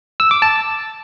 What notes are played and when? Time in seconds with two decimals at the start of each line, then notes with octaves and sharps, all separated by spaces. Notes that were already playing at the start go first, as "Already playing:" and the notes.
0.20 E6
0.31 D6
0.42 A5